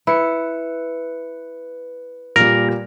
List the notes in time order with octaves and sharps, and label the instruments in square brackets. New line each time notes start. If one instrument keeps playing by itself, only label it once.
[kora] E4 [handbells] B4 C#7
[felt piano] A#2 G3 [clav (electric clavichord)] A#4